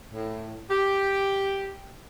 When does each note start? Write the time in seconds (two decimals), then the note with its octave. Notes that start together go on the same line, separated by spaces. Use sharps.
0.14 A2
0.71 G4